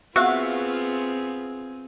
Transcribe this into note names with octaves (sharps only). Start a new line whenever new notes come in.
B3 C4 F4 F#4 G#4 E5 F5